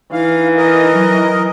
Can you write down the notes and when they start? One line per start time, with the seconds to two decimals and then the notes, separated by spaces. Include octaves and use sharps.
0.13 E3 D#4 F5
0.57 A#4 D#5
0.94 F#3